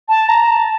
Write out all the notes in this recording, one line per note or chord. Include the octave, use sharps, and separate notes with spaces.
A5
A#5
A5